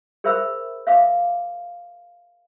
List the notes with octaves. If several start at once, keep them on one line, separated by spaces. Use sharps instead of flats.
G#4 A#4 C5 E5 B5 E6
E5 F5 D6